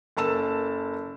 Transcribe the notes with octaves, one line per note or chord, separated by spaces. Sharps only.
F#1 A4 A#4 A5 E6 E7